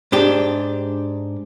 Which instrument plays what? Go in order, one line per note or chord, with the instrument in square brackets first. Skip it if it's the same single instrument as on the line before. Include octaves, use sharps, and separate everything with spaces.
[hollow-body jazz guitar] G#2 D4 G4